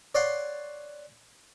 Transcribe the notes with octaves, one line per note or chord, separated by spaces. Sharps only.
C#5 D5 F5 F#5 C6